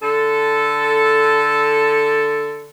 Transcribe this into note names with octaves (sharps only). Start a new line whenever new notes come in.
D3 A4